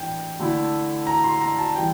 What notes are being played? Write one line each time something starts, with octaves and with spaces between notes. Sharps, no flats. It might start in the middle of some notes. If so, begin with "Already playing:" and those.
Already playing: A2 E3 D4 G5
D3 A3 E4
A#5
C6
A#5
A5
E3 G3 G5